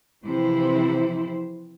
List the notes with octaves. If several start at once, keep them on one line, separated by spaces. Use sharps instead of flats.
C3 E3 F3 E4 C5